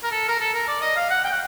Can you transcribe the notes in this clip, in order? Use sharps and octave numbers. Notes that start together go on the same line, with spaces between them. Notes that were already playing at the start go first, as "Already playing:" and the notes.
A#4
A4
A#4
A4
A#4
D5
D#5
F5
F#5
G5
F#5